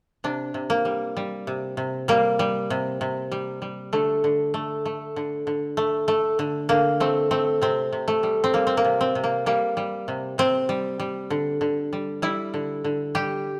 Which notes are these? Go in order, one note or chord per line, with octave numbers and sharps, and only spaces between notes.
C3 D4
C3
A#3
G3
G3
C3
C3
G3 A#3
G3
C3
C3
G3
G3
D3 A3
D3
A3
A3
D3
D3
A3
A3
D3
D3 A#3
A3 C4
A3 C4
C3 C4
C3
A3
G3
C4
G3 A#3
C4
A#3
C3
C4
C3
A#3
G3 A#3
G3
C3
C3 C4
G3
G3
D3
D3
G3
G3 E4
D3
D3
G3 G4